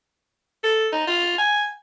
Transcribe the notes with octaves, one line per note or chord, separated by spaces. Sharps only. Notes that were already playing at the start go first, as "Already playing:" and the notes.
A4
D#4
F4
G#5